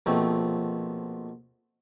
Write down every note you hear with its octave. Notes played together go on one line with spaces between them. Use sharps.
A#1 B2 F3 A3 C4